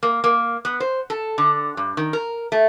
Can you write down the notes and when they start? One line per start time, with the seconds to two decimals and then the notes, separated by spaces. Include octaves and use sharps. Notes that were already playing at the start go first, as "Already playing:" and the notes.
0.03 A#3
0.24 A#3
0.65 B3
0.80 C5
1.10 A4
1.38 D3
1.77 G2
1.97 D#3
2.13 A#4
2.52 A3